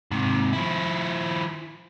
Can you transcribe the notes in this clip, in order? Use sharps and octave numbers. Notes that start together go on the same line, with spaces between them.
G#2 C3
F3 E4